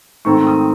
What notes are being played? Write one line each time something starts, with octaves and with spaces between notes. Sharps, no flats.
G#2 D#3 A3 C4 C#6
D#6